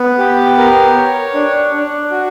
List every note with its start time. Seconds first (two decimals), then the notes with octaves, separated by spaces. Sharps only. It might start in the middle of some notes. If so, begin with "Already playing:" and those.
Already playing: B3
0.19 G4
0.58 A#4
0.96 C#5
1.34 D4
1.74 D4
2.11 F#4